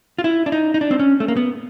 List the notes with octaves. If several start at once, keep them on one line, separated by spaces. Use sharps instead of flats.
F4
E4
D4
D#4
D#4
D4
C4
C#4
A3
A#3
B3